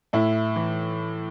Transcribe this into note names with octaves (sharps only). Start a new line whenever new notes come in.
A2 E4
E3